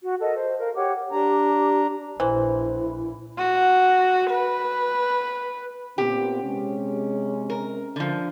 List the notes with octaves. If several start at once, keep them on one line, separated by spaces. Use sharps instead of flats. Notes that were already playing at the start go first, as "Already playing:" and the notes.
F#4
A4 A#4 D#5
C5
A#4 F5
G4 C#5 F#5 D6
D4 G4 A#5
A#1 E3 E4 C5
F#4
B4
A#2 B3 C4 G4
C3 G#3 C#4
A#4
D3 F3